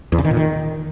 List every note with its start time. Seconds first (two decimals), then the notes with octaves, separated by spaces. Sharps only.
0.12 E2
0.18 C#3
0.24 D#3
0.31 A#2
0.37 D#3